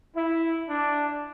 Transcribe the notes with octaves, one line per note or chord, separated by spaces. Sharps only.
E4
D4